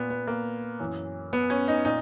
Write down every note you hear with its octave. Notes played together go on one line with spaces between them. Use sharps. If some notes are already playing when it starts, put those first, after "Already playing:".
Already playing: A#2 B3
B3
A#3
F#2 E3
B3
C#4
D#4
A#2 D#4